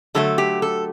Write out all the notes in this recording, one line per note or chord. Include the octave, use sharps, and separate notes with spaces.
D3 F#3 A3 A4
G4
A4